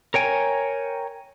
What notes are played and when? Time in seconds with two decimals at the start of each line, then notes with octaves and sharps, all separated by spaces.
0.14 A#4 C#5 G5 G#5